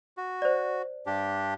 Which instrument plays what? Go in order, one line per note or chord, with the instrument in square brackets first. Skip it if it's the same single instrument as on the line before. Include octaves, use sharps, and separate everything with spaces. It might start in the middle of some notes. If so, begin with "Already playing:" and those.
[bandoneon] F#4
[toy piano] C5 D5
[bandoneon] G2 D4 G4